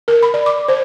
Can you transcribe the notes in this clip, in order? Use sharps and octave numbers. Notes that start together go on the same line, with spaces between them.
A#4
B5
D5
D6
C5